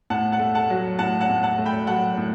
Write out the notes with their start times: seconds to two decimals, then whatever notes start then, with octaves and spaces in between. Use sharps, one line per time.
0.10 A2 F#5 A5
0.32 F#5 A5
0.39 A3
0.55 F#5 A5
0.70 F#3
0.99 A2 F#5 A5
1.21 F#5 A5
1.29 A2
1.43 F#5 A5
1.58 A3
1.65 G5 B5
1.87 F#3 F#5 A5
2.18 A2